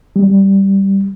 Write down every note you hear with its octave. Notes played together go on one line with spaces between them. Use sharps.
G3